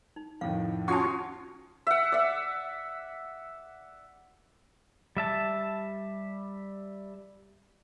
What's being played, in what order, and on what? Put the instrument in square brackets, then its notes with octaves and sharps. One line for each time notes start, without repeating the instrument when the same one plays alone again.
[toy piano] D#4
[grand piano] F2 A2 D#3 [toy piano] F5
[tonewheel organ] C#4 F#4 [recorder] F4 [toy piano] F#5 A5 [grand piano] C#6 D#6
[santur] E5 F#5
D5 E5
[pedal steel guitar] G3 E5 A5